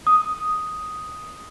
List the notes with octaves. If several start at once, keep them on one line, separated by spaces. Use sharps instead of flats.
D#6